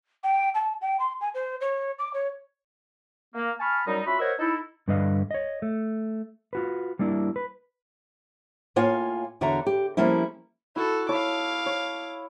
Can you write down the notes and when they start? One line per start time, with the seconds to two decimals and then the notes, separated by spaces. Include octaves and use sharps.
0.24 G5
0.54 A5
0.81 G5
1.00 C6
1.21 G#5
1.34 C5
1.61 C#5
1.99 D6
2.14 C#5
3.35 A#3
3.60 G#5 A5 B5 C#6 F6
3.86 F#2 F#3 G3 D#4
4.06 C#4 F4 F#4 E5 B5
4.19 A#4 C5 C#5 D#5 E5 F#5
4.39 D#4 E4 A4
4.88 G2 D3 G3 B4 D#5 F5
5.31 C#5 D#5
5.62 A3
6.53 F4 F#4 B4
6.99 G3 A#3 D4 E4
7.36 B4
8.76 A2 A#3 F4 C#5 F5 G#5
9.41 E2 D3 F#4 C#5 E5 A#5
9.66 G4
9.97 F3 G3 A3 A#3 C#4 E4
10.76 E4 F#4 A4
11.09 E4 C#5 F5 A5 D6
11.66 C#5